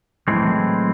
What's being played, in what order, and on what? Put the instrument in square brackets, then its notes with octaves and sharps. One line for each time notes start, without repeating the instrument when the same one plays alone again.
[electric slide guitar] A2 E3 G#3 C4 [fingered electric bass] G3
[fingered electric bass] F#3
F3
F#3